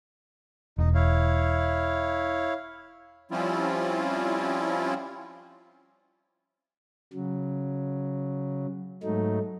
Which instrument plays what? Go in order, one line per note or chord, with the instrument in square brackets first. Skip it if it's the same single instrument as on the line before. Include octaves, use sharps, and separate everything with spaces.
[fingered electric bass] E1 [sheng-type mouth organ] D#4
[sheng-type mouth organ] E4 C#5 F5
[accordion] F3 G3 C4 C#4 E4 F4
[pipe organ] C#3 F#3
G#2 F#3 A3 D#4